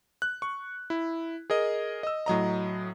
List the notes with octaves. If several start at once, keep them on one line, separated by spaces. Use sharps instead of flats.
F#6
C#6
E4
G#4 A#4 D#5
D#5 E6
A2 F#3 D#5 A#5